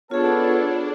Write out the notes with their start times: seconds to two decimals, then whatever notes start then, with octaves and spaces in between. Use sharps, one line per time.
0.11 B3 D4 F4 G#4 A4 C#5